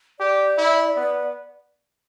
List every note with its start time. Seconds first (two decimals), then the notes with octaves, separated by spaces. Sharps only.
0.20 G4 D5
0.58 E4
0.96 B3